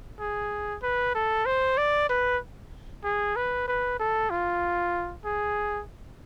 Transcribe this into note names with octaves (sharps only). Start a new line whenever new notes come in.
G#4
B4
A4
C5
D5
B4
G#4
B4
B4
A4
F4
G#4